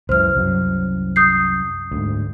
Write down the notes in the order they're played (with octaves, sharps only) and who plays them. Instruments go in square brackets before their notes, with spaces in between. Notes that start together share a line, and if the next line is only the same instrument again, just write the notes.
[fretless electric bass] C#2 F#2 E3 [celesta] C5 F6
[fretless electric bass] C2 F#2 F#3
[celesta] D#6 G6 C7
[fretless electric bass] D2 G#2